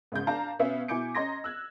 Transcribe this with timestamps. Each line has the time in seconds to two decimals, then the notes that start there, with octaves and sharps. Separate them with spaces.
0.12 G#2 C#3 G6
0.27 D4 F5 A5 A#5
0.59 B2 B3 C#4 E5 F5
0.88 B2 E4 G#5 D6 G6 C#7
1.15 C#4 D#5 A#5 C6 G#6 A#6
1.44 E6 F#6 G#6